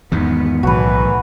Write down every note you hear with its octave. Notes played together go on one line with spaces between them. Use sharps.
E2 G#2 D#3 B3
B1 A2 D#3 E3 F#4 B4